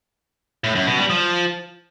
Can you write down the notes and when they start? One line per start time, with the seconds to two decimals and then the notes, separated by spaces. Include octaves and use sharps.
0.64 A2
0.75 F#2
0.87 B2
0.98 G3
1.10 F3